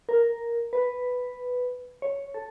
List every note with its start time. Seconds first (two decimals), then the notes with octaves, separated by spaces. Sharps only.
0.09 A#4
0.73 B4
2.02 C#5
2.34 A4